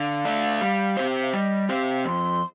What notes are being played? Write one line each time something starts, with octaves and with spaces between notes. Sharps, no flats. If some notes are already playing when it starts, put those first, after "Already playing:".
Already playing: D3 F5
A3 D4
G3
C4 G4 C5
G5
F5
G3 D#5
C4 G4 C5 F5
F2 C6